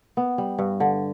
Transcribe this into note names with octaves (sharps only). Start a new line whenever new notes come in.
B3
G3
G2
D3